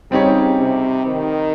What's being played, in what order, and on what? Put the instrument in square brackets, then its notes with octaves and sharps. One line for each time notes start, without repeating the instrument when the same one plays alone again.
[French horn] C#3 [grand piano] G3 C4 D#4 G4 C#5
[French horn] C3
D#3